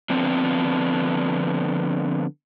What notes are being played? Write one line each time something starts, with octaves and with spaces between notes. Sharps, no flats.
D3 F3 B3 C4 D4